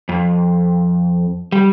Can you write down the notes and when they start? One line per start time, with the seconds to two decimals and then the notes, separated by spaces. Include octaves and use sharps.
0.09 F2
1.52 G3